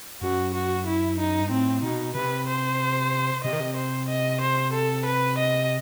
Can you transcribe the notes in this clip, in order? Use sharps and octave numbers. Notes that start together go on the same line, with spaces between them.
F#2 F#4
F#4
E4
D#4
G2
A2 C4
B2 D#4
C3 B4
C5
C3 D#5
D#3
C3
C5
D#5
C5
A4
B4
D#5